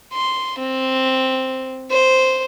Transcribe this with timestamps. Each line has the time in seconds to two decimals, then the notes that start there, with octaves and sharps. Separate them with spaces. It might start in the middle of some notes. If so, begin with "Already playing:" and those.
0.13 C6
0.59 C4
1.91 C5